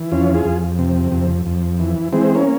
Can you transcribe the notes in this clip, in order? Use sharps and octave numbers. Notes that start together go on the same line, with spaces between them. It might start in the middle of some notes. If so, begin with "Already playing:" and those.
Already playing: E3
F2 C#4 F4
F4 G#4
F2
C3
F2
F2
E3
E3 G#3 C4
A#3 C#4